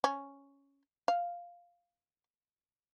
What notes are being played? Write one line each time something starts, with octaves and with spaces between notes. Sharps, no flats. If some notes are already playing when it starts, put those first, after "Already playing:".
C#4
F5